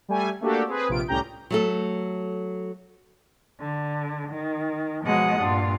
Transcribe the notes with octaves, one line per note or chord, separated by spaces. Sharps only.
G3 A3 G#5
A3 A#3 D4 F#4 G4 A4
C4 G#4 B4
A#1 C3 F4 D7
C2 A2 C#4 G4 A#5 G6
F#3 A3 A4
D3
D#3
B2 F3 F#3 G#3 F#5 D#6
G2 A#2 D4 F4